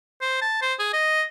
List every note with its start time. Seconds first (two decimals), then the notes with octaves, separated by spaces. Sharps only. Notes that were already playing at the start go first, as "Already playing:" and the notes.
0.21 C5
0.41 A5
0.62 C5
0.79 G#4
0.93 D#5